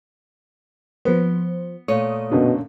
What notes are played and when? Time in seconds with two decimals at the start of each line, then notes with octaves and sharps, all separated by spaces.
1.05 F3 B3 C5
1.88 A#2 A3 C#5 D#6
2.32 F#2 B2 D3